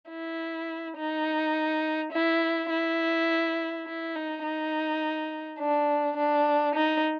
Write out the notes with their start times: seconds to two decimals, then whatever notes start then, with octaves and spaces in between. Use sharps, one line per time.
0.10 E4
0.97 D#4
2.12 E4
2.70 E4
3.86 E4
4.15 D#4
4.43 D#4
5.60 D4
6.17 D4
6.75 D#4